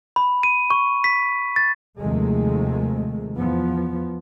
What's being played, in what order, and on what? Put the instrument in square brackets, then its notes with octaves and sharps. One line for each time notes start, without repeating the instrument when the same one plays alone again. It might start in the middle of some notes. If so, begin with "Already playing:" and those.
[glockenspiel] B5
D#7
C#6
B6
A6
[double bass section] D#2 C3 D#3 F3 G#3 A3
E2 F3 B3